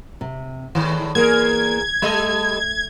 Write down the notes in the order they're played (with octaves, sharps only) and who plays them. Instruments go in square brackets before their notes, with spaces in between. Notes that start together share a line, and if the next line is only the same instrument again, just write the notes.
[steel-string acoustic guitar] C3
[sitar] E2 A2 D#3 [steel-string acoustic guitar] E3
[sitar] E2 G#4 A#4 [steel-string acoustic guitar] A#3 [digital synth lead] G#6
[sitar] G3 A4 D#5 [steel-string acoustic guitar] A3